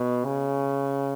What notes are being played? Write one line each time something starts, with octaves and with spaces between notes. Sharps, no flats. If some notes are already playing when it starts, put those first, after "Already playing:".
Already playing: B2
C#3